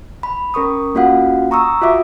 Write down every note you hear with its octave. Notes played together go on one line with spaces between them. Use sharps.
B5
C#4 A#4 C#6 D#6
A#3 C#4 F4 F#4 F5 F#5
A#5 C#6 D#6 E6
F4 F#4 E5 D6